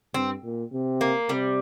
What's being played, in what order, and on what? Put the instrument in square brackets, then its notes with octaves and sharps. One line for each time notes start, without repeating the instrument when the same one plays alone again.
[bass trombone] G2 [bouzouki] C4
[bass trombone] A#2
C3
[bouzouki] A#3
[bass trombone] C3 [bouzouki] G3